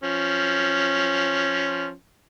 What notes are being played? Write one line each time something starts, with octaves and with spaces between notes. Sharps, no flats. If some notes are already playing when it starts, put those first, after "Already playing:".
F3 C#4